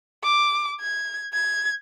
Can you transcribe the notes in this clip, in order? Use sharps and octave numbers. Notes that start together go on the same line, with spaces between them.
D6
G#6
G#6